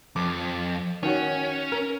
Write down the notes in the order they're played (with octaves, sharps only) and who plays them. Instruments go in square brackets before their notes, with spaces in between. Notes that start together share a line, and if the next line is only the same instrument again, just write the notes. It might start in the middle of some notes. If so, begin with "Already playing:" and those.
[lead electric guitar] F2 [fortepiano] D6
[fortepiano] D#3 F#4 C#5 [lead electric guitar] C#4
[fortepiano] A#4